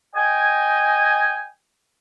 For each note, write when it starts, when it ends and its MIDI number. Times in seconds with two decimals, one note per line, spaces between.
0.15 1.45 75
0.15 1.45 79
0.15 1.45 80